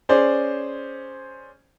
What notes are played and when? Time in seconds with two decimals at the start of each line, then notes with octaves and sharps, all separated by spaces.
0.09 C#4 G#4 C5 D5